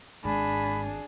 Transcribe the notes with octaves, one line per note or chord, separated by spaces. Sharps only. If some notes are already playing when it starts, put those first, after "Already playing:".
G#1 G#2 D4 G#4 B5